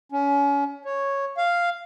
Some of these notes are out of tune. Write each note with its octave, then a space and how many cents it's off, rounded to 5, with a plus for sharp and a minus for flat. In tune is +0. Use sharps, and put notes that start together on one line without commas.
C#4 +30
C#5 -5
F5 -5